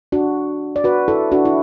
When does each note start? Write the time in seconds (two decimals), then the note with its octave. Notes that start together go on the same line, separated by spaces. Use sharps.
0.12 D4 F#4
0.76 D5
0.84 F#4 B4
1.08 E4 A4
1.32 D4 F#4
1.45 E4